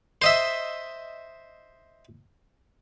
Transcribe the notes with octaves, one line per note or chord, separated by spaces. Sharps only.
C5 D#5 E5